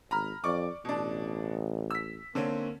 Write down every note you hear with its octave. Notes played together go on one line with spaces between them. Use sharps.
G#1 A#5 B5 F6
F2 D5 C#6 D6
A1 B2 D4
E6 B6
D3 A#3 C4 C#4